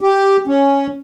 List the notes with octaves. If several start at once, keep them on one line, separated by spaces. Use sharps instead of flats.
G4
C#4